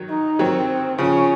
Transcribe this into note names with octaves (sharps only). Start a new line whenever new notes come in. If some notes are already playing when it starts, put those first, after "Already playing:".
Already playing: D#3 F#3
D#4
D#3 F#3 C4
C#3 F3 C#4